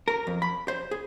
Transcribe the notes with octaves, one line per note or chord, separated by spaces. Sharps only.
A#4
F2
B5
C5
G#4